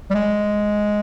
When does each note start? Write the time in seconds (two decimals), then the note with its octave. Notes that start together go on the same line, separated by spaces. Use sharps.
0.11 G3
0.15 G#3